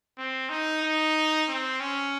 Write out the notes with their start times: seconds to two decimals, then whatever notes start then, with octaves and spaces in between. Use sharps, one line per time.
0.17 C4
0.49 D#4
0.83 D#4
1.47 C4
1.80 C#4